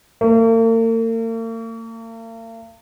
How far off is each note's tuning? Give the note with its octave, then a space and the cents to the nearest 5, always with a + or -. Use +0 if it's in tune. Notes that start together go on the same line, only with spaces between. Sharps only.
A#3 -45